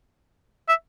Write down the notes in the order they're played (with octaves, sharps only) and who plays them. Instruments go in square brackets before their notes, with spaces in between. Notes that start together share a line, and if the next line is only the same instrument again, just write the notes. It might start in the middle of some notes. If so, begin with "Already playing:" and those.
[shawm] E5